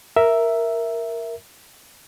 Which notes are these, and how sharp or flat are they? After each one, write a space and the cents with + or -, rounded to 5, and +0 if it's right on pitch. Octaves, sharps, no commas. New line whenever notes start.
A#4 +0 E5 +0